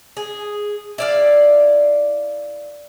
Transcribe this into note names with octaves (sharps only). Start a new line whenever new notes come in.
G#4
E4 D5 F5